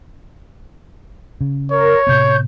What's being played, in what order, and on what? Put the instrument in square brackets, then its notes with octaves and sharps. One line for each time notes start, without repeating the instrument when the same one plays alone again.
[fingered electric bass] C#3
[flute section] A#4 [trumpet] C#5
[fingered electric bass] A2 C3 B3 [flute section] G6